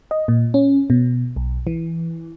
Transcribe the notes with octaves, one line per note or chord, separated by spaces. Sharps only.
D#5
A#2
C#4
B2
B1
E3